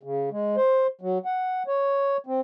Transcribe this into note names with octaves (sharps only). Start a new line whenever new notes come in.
C#3
G#3
C5
F#3
F#5
C#5
C4